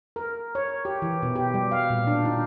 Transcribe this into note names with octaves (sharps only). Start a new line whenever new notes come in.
A#4
C#5
G4
E3
B2
G4
G3
F5
A#2
D4
D#4